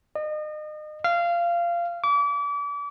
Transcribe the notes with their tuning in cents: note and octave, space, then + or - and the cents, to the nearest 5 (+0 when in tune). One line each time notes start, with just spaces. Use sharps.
D#5 -35
F5 -20
D6 -35